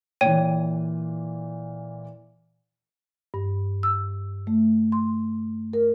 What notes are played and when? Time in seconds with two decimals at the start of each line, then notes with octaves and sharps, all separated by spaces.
0.21 A#2 E3 C#5 G5 D#7
3.34 G2
3.83 E6
4.47 A3
4.92 C6
5.73 A#4